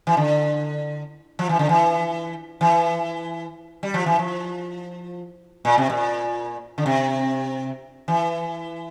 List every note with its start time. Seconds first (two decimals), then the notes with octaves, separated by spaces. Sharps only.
0.07 E3
0.17 D3
1.39 F3
1.49 E3
1.59 D3
1.69 E3
2.61 E3
3.83 G3
3.94 F3
4.06 E3
4.19 F3
5.65 A#2
5.78 C3
5.90 A#2
6.78 D3
6.86 C3
8.08 E3